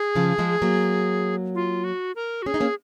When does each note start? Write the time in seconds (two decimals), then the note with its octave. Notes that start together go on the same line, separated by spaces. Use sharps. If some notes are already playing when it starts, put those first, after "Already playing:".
Already playing: G#4
0.16 C#3 F3
0.38 F3 G#3
0.62 F#3 A#3
1.55 F4
1.84 F#4
2.16 A#4
2.42 F#4
2.46 C#4 G#4
2.54 D#4
2.60 A#3 C#4